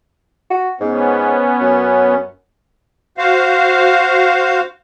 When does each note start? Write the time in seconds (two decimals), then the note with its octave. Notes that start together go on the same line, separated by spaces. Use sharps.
0.50 F#4
0.80 G#2 B3 C#4
1.61 F#2
3.18 F#4 C5 F5